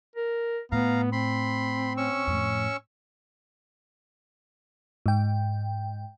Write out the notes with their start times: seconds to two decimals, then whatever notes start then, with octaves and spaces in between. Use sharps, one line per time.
0.16 A#4
0.72 A2 B3 F5 A#5
1.12 C4 B5 C6
1.97 C#4 C#6 E6
2.27 F2 A2
5.06 G#2 G5